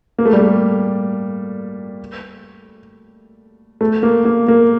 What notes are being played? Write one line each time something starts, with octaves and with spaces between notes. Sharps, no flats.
A#3
A3
G3
A3
A3
A#3
A#3
A#3